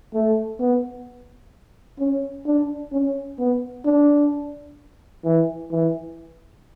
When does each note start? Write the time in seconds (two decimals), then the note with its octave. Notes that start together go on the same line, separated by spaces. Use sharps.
0.14 A3
0.60 B3
1.99 C#4
2.46 D4
2.93 C#4
3.39 B3
3.86 D4
5.24 E3
5.71 E3